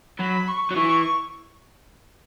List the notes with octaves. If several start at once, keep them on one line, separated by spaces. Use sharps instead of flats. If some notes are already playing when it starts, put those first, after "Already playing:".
F#3 B5
C#6
F#3
E3 C#6